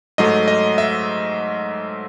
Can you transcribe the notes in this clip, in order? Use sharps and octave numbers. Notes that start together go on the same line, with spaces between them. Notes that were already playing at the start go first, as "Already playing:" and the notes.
G#2 F#3 A3 D#5
D#5
E5